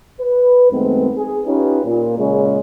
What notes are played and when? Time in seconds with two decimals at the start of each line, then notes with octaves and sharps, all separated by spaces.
0.21 B4
0.71 F#2 D#3 G#3 A3 B3 C4
1.16 G#4
1.46 C#4 D#4 F4 G4 B4
1.85 A#2
2.18 A#2 C#3 G#3 C#4